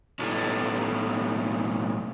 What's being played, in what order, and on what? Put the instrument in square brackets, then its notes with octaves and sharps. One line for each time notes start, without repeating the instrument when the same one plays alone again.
[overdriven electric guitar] B1 A2